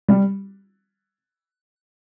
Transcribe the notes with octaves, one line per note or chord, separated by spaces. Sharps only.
G3